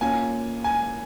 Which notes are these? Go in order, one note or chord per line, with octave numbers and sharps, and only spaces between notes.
A#3 C#4 F4 G#5
G#5